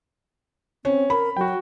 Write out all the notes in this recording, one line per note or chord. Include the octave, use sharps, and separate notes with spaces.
C4 C#4
A#4 B5
F#3 F#4 G5